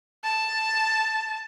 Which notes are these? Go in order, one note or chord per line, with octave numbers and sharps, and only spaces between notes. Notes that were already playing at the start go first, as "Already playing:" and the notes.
A5